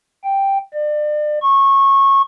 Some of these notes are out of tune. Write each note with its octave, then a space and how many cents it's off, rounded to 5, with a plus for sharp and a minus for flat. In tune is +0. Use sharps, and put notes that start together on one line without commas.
G5 +0
D5 +35
C#6 -20